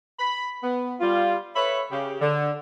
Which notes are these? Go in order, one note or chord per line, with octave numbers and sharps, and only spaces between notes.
B5
B3
G3 F4
A4 B4 C#5 E5 B5
C#3 G4
D3